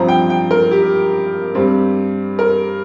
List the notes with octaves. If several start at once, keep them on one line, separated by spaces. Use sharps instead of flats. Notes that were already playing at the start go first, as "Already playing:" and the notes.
Already playing: G2 F3 C4 A#5
G5
G5
A#4
G4
G2 G3 C4
A#4